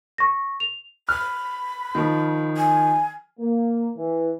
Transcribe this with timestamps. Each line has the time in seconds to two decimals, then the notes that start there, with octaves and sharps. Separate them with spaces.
0.18 C#6 A#6
0.60 F7
1.09 B5 F6
1.95 D#3 F3
2.57 G#5
3.38 A#3
3.97 E3